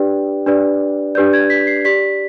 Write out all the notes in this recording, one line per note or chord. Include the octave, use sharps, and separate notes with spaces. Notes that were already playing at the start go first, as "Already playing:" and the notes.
Already playing: D4 G4 B4 D5 G5
D4 G4 B4 D5
D4 G4 B4 D5 G6
G#6
B6
C7
G4 D5 B6